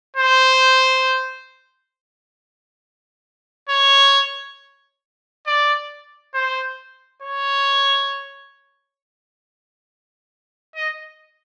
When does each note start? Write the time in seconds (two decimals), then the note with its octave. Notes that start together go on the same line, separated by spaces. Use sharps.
0.17 C5
3.69 C#5
5.47 D5
6.35 C5
7.22 C#5
10.75 D#5